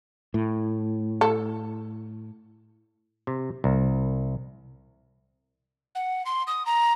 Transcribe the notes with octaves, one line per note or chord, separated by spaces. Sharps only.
A2
A4
C3
C2
F#5
C6
D#6
A#5